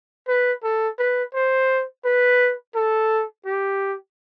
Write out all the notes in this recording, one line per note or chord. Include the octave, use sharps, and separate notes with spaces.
B4
A4
B4
C5
B4
A4
G4